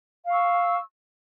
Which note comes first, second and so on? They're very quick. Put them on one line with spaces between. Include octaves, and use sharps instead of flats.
F5 C#6 E6